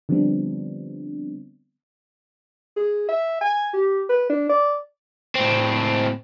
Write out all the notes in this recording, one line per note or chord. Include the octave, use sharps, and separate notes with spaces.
D3 F3 G3 B3 C4 D4
G#4
E5
G#5
G4
B4
D4
D5
A2 C4